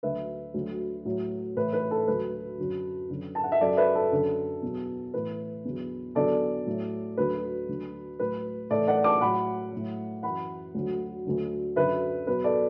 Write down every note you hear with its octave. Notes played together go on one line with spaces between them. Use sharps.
D2 D3 F#3 B4 E5
D2 D3 F#3
A2 F#3
A2 E3 B4
B4
A4
D2 D3 F#3 B4
F#2 D3 F#3
F#2 D3 F#3
A5
F#5
E5
F#2 F#3 A4 D5
B4 E5
A4
F#2 D3 F#3
E2 B2 F#3
A2 E3 B4
E2 D3 F#3
E2 D3 F#3 A4 D5
A2 F#3
D2 D3 F#3 B4
D2 D3 F#3
A2 F#3 B4
A2 E3 A4 D5
D5 F#5
A5 D6
A2 F#3 F#5 B5
A2 F#3
F#2 E3 F#5 B5
D2 D3 F#3
D2 D3 F#3
F#2 D3 F#3 B4 E5
E2 B2 F#3 B4
A4 D5